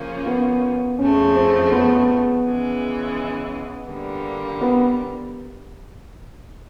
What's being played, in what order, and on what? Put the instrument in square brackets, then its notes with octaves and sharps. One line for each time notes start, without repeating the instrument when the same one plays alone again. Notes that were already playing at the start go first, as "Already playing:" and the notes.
Already playing: [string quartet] C#3 F3 A#3 C#4
[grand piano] B3
[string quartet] F2 C#3 F3 A3 [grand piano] C#4
[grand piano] C4
B3
[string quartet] C#3 E3 G#3
D3 G3 A#3
[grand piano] B3